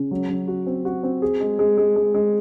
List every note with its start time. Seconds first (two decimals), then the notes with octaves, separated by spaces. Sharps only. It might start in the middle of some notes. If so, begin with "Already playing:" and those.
Already playing: C#3
0.11 F#3
0.30 F#3
0.48 F#4
0.66 C4
0.85 F#4
1.03 C4
1.22 G#4
1.40 G#3
1.59 G#3
1.77 G#3
1.96 G#3
2.14 G#3